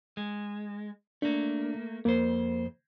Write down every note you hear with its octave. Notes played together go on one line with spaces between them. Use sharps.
G#3
A3 A#3 D4
F2 A#3 C5